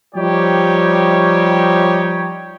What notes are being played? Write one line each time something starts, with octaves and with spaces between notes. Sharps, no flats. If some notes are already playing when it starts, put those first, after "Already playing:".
F3 G3 D#4 G4 C#5